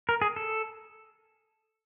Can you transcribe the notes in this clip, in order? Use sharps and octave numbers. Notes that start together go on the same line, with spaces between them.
A#4
G#4
A4